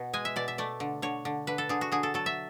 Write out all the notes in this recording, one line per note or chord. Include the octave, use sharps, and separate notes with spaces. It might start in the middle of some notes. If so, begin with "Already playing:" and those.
Already playing: B2 F#5
G#3 G#5
E5
B2 D5
E5
A3 D5
D3
D3 C#5
D3
D3 B4
A4
D3 G#4
F#4
D3 G#4
A4
F#3 A4
E5